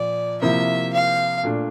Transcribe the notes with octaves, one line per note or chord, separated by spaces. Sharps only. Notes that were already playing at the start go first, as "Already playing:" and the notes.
Already playing: A#2 F3 D5
C3 F3 A#3 E4 E5
F5
A#2 A3 D4